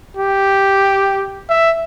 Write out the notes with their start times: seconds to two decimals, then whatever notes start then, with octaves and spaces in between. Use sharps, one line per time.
0.17 G4
1.49 E5